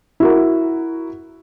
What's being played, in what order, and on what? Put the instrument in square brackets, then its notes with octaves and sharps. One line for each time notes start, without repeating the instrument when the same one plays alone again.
[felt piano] E4 F#4 A#4